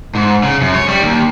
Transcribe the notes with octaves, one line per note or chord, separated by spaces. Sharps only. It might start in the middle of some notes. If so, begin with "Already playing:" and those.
G#2
C#3
F#2
C#5
G3
D#2